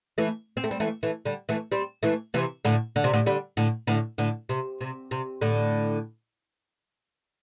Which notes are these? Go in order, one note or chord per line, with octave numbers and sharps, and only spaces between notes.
E3 A3
C4
A3
G3 C4
E3 A3
E3 A3
D3 G3
E3 A3
G3 C4
E3 A3
C3 E3
A2 D3
D3
C3
A2 D3
D3 G3
A2 D3
A2 D3
A2 D3
C3
C3
C3
A2 D3